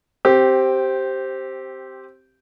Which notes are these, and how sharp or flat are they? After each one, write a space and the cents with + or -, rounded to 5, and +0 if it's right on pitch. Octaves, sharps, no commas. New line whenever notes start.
C4 +5 G4 -10